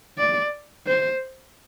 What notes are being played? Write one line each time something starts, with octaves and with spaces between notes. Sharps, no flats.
D5
C5